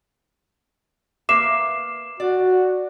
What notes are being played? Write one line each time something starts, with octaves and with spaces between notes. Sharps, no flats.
A#3 B4 E5 D6 C7 E7
F#4 D5